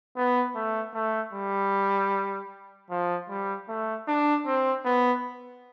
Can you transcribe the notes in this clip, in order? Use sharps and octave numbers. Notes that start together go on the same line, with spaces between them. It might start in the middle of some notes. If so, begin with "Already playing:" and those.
B3
A3
A3
G3
F3
G3
A3
D4
C4
B3